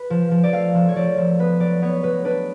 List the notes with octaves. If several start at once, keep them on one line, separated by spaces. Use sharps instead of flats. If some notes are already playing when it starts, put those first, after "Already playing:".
Already playing: B4
F3
F3
D5
A3 F5
F3
C#5
F3 D5
F3
B3 B4
F#3 D5
B3 C#5
F#3 B4
D4 B4